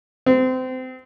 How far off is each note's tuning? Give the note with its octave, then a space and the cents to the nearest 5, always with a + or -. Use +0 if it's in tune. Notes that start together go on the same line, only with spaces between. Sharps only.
C4 -30